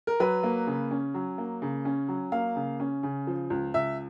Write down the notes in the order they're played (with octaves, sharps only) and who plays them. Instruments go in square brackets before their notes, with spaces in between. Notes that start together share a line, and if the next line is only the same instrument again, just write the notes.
[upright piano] A#4
F#3 B4
A#3
C#3
C#4
F#3
A#3
C#3
C#4
F#3
A#3 F5
C#3
C#4
C#3
F3
C#2
C#2 E5